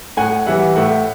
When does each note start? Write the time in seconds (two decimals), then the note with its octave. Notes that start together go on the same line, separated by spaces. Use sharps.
0.17 A2 F#5 G#5
0.47 E3 G3 E5 F#5
0.76 A2 E5 F#5